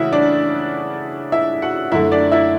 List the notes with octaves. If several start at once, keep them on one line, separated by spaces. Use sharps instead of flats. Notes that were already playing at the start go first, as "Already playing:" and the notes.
Already playing: C#3 E3 A3 E4 F#4 E5 F#5
D4 D5
E4 E5
F#4 F#5
F#2 D3 A3 E4 E5
D4 D5
E4 E5